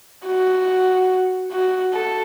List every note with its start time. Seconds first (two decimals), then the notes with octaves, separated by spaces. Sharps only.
0.26 F#4
1.52 F#4
1.93 A4